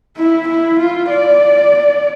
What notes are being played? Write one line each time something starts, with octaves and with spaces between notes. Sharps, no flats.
E4
E4
F4
D5